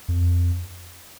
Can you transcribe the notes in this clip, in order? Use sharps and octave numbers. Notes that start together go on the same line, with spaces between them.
F2